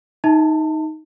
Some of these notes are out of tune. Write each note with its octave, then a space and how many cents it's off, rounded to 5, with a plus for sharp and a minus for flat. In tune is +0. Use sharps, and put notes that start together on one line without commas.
D#4 +5 E5 -35 A5 +30